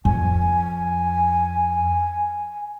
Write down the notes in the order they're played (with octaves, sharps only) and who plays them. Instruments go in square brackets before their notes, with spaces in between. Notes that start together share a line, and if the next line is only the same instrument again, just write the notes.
[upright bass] F2 [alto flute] G#5